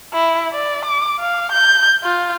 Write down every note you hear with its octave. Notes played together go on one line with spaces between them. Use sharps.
E4
D5
D6
F5
G6
F4